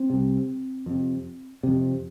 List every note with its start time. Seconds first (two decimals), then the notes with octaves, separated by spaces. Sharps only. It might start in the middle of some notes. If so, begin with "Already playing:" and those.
Already playing: C4
0.10 C2 C3
0.86 F2 C3
1.63 F2 C3